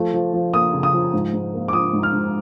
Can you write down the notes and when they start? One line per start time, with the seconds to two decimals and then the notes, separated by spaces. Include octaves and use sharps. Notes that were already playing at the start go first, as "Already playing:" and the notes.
Already playing: F3 A3
0.14 F3
0.33 F3
0.53 A#3 D#6
0.73 C#3
0.83 D#6
0.93 F3
1.13 G#2
1.33 G#2
1.54 A#3
1.68 D6
1.73 F3 D#6
1.93 G#2
2.03 F6
2.13 G#2